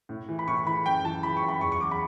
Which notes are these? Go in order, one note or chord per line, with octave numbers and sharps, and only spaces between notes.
A2
E3
B5
A2 C#6
E3 B5
F#2 G5
E3 A5
E3 B5
C#6
F#2
B5
E2 C#6
C#6
E2 D6
B5